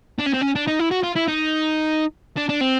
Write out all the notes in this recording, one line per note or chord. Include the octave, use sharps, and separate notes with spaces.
D4
C#4
C4
C#4
D4
D#4
E4
F#4
F4
E4
D#4
D4
D4
C4